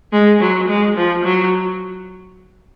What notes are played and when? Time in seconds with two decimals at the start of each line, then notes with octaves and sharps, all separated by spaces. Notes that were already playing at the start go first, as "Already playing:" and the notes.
0.12 G#3
0.41 F#3
0.68 G#3
0.96 F3
1.24 F#3